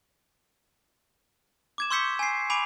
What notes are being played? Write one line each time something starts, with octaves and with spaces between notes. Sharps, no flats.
D6 G#6 E7
C6 C#6 E6 G6 B6 C#7
G#5 C7
G#5 B5 D6 D7 F7